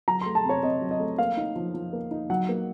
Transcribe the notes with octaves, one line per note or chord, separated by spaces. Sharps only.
F#3 A#5
A3 C6
A5
C3
C#5
C3 D#5
F#3
D#5
A3
A#3 F5
D#4
F3
F3
A#3
D#4
F#3 F#5
A#3